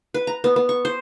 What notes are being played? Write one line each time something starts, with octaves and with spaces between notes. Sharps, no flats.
B4
A#5
B3
B3
C#6
C5